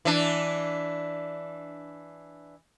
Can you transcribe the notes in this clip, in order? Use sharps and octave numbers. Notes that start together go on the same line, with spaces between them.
E3 D4